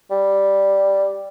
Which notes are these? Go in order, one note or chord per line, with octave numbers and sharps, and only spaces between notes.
G3